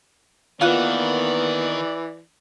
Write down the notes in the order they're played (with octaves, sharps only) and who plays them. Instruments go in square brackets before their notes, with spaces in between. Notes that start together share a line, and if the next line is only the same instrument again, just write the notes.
[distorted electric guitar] D#3 [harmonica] E3 D5 [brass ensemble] A#3 B3 [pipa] F4 F#5